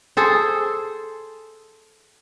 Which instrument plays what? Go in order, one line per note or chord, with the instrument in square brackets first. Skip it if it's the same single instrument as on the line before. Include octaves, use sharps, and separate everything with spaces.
[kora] G#4 A4 C5